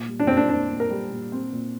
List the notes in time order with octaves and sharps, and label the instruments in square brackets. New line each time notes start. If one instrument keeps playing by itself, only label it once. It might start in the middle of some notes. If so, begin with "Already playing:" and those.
Already playing: [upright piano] A#2
G3
[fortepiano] D4
[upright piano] A#2 [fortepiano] C4
[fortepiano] D4
[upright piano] C4 [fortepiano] D4
[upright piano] A#2
[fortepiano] A#4
[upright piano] G3
A#2
C4
A#2